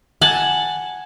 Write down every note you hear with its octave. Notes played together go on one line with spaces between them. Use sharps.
F#5 G#5 A5